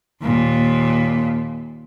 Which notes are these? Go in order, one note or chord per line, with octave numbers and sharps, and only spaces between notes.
D#2 A#2